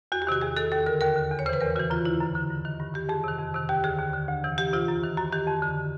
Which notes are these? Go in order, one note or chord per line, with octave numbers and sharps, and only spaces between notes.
E2 F#4
G4
C3 D#3 F#4
E2 G#4
C3 D#3 A4
D#2 A4
D3 A#4
D#2 A#4
D3
E2
C#5
C#3 E3 B4 C5
E2 A#4
C#3 E3 F#4
F#2 F4
D3 E4
F#2
D3
G2
D#3
G2
D#3 G4
F2 G#4
C3 D#3
F2
C3 D#3
D#2 G4
D3 G#4
D#2
D3
D2
C3 E3
D2 G4
C3 E3 F4
F#2
D#3
F#2 F#4
D#3 G4
F2
D3